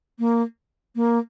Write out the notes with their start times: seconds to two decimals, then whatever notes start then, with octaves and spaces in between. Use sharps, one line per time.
0.19 A#3
0.95 A#3